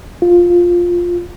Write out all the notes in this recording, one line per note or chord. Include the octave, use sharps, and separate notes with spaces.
F4